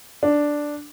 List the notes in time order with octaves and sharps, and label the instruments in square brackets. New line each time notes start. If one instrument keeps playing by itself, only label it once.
[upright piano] D4